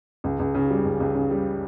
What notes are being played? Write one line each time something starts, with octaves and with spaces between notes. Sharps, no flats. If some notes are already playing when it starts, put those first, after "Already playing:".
C#2
C#2
C#3
G3
C#2
C#2
C#3
G3